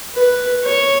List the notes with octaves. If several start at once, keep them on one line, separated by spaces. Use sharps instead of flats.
B4
C#5